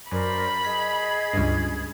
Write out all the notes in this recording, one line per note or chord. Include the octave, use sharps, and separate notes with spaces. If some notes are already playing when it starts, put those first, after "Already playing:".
F#2 A#4 C5 D5 B5
G#4 D#5 G#6 B6
C#2 G2